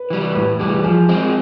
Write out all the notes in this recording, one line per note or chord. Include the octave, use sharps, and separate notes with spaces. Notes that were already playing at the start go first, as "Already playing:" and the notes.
Already playing: B4
E3 G3
A2 B4
E3 G3 G4
G#4
F3 G#4
G#3 C4